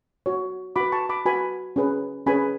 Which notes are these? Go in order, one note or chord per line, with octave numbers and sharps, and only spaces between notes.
F#4 C#5
F#4 B4 B5 D6
A5 C#6
B5 D6
F#4 B4 G#5 B5
C#4 G#4 B4
C#4 G#4 B4 G#5 B5